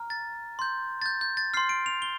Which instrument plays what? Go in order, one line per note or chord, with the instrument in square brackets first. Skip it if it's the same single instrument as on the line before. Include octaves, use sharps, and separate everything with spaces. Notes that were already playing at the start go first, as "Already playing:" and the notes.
Already playing: [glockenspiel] A#5 F6
A6
C6 G6
A6
G6
G6
A6
C6 F6 C7
D7
F7
G7